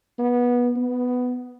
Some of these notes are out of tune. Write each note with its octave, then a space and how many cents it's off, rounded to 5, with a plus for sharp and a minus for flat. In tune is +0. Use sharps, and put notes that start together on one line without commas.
B3 -20
B3 +10